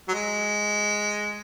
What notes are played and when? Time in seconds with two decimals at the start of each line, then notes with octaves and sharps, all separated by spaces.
0.08 F#3
0.14 G#3